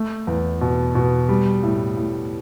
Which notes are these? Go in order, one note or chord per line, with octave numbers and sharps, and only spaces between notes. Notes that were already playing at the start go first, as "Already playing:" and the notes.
Already playing: A3
E2
B2
B2
G3
A2
A2